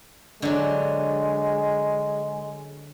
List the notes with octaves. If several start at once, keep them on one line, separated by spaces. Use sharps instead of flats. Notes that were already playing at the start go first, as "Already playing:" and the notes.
D3 F#3 G#3